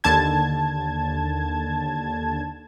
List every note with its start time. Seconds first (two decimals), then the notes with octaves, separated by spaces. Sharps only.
0.04 D#2 D3 A5 G#6